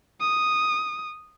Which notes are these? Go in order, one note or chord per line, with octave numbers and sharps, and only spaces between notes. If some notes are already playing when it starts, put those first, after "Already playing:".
D#6